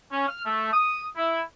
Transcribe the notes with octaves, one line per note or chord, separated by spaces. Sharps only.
C#4
F6
A3
D#6
E4